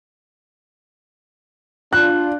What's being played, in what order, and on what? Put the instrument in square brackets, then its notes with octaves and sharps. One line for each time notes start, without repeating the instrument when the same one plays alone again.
[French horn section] D4 F4 [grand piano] F#6